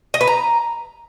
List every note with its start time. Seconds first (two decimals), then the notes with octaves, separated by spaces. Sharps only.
0.14 D#5
0.21 B4
0.27 A#5